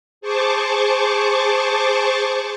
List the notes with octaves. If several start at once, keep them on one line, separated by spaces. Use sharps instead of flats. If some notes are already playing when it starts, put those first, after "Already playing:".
G#4 C5 A5 C#6 D6